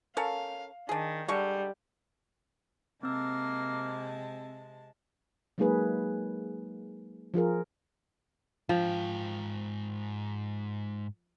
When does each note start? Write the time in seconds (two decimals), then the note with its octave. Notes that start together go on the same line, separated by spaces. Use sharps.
0.17 C#4 A4 A#4 F5
0.89 D#3 D4 G#4
1.28 D3 G3 G#3 C#6
3.03 C3 G#3 A#3 C4 A5 E6
5.58 F#3 G#3 A#3 D#4 G#4 B4
7.34 F3 F4 G#4 A#4
8.69 G#2 F3 G5